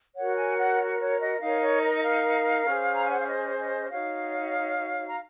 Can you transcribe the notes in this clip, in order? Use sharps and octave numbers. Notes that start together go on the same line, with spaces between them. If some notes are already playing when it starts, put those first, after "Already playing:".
F#4 A#4 C#5 F#5
G#5
F#5
C#5
D#5
D#4 A#4 C#5 F5
C#5
D#5
F5
C#4 G#4 C5
A#5
G#5
F#5
F5
D#5
D#5
D#4 F#4 C#5 F5
A#5